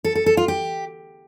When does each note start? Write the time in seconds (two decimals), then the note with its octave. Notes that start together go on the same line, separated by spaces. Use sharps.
0.04 A4
0.15 A4
0.26 A4
0.37 F4
0.48 G4